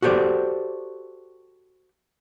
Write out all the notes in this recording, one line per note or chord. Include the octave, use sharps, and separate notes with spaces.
F#4 G4 A4 C5 D5